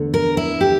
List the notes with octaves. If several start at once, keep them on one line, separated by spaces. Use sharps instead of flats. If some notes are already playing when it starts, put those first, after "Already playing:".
Already playing: E2 D3 A3
A#4
E4
G4